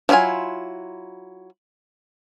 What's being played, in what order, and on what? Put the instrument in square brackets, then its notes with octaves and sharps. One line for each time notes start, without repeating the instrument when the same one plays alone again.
[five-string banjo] F3 F#3 E4 F4 G#5